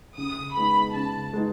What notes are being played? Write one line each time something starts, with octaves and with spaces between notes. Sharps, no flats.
C#3 D#6
G#3 B3 D#4 B5
C#3 A5
G#3 B3 D#4